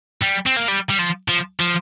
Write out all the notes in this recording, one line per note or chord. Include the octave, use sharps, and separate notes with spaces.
G3
C4
A#3
G3
G3
F3
F3
F3